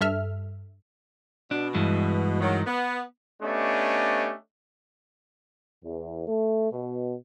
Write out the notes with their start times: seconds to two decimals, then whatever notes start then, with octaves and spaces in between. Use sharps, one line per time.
0.01 G2 A4 E5 F6
1.51 B2 D4
1.74 G2 E3 G#3
2.41 D#3 F#3
2.66 B3
3.41 A3 B3 C#4 D4 G4 D#5
5.83 E2
6.27 A3
6.71 B2